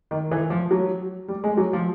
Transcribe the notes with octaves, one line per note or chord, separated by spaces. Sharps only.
D#3
E3
F3
F#3
G3
G#3
F#3
F3